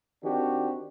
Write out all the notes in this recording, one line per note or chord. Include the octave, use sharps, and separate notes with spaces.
D#3 C4 D4 F#4 G4